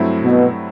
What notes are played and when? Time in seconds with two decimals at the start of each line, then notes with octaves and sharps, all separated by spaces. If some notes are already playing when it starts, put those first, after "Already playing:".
Already playing: G2 F#3 A3 C4 E4
0.23 B2